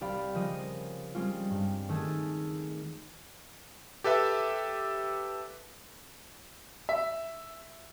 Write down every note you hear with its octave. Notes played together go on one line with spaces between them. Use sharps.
C2 G4 D5 F5 B5
C#3 F3 A#4 D#5 D#6 D#7
G3 G#3 C4 C#4 F4
G2
D#3 A3 G#4 A4
G4 A4 B4 E5
E5